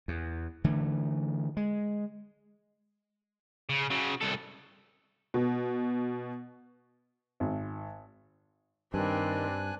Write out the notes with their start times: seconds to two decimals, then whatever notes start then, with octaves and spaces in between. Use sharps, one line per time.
0.08 E2
0.64 D3 E3 A3
1.57 G#3
3.70 C#3
3.91 C#3 F#3
4.21 C2 A4
5.34 B2
7.40 G#1
8.94 G2 D#3 G3 C4 D4 G#5 F#6